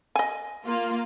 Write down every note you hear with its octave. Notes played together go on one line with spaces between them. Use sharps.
D#5 G#5
A#3 F4